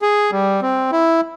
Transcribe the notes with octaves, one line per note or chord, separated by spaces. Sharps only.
G#4
G3
C4
E4